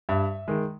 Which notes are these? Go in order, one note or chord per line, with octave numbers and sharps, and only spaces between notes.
G2 E5
D#3 G#3